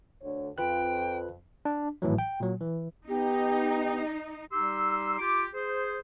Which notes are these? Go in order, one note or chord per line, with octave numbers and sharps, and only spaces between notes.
D2 D3 C#5
F2 F4 B4 G5 F#6
D4
G#1 A2 E3 F#3
G5
A#2 F#3
E3
B3 D#4 G4
G3 D#4 G4 C6 E6
F4 G4 D6
G#4 C5